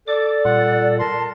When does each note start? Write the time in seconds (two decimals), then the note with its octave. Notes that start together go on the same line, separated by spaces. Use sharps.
0.08 A4 D5 D6
0.45 A#2 G3 F4 F#5
0.99 A#4 A5 C6